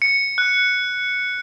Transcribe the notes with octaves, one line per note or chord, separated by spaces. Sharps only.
C#7
F#6